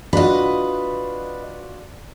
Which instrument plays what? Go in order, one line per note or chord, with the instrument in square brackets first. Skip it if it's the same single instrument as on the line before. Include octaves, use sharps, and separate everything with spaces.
[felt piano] D4 F4 F#4 [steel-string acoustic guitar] B4 D#5